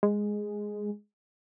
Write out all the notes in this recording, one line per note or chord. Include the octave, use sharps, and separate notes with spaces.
G#3